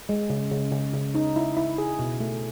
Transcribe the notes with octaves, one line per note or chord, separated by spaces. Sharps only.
G#3
C#3
C#3
C#3
C#3
D#4
E4
E4
G#4
B2
A3